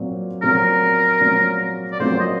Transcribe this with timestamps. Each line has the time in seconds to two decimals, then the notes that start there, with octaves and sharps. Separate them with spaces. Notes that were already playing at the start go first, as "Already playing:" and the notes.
Already playing: A#2 F#3 C4
0.42 A#2 F#3 C4 A#4
1.21 A#2 F#3 C4
1.92 D5
2.00 A#2 F#3 C4 C5
2.20 D#5